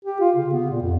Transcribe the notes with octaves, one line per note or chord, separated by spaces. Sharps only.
G4
F4
C#3
B3
A#2
F2